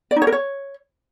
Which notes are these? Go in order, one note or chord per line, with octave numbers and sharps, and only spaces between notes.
D5
D#4
C#5
A#4
C#5